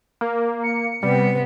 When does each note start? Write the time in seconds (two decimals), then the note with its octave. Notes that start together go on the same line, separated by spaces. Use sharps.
0.21 A#3 A#4
0.63 C#7
1.03 C3 G3 B3